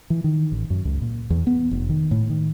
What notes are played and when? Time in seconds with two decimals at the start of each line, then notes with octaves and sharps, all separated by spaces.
0.10 E3
0.24 D#3
0.52 A1
0.70 F#2
0.85 C#2
1.02 A#2
1.30 E2
1.47 B3
1.71 F1
1.90 D#3
2.11 A2
2.30 D#3